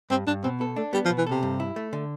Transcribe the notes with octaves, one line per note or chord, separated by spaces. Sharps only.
G2 C4
G2 D4
B2 C4
B3 A4
A3 D4
G3 B3
F3
B2
E3
C3 A4
G2
E4
A3
D3